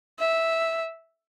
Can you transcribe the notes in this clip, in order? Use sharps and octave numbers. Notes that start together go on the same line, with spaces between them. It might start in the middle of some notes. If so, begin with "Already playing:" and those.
E5